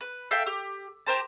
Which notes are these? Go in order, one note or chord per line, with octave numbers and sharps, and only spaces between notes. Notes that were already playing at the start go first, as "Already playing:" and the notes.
B4
A4 E5 F5 G5
G4
G4 A#4 C5 A5